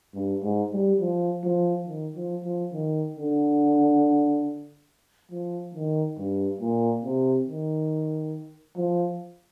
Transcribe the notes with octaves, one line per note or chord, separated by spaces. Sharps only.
G2
G#2
G3
F3
F3
D#3
F3
F3
D#3
D3
F3
D#3
G2
A#2
C3
D#3
F3